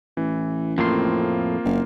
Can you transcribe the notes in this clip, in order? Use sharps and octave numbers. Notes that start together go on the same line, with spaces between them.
A1 E3
F2 A2 A#3 C4 F4 C6
F#1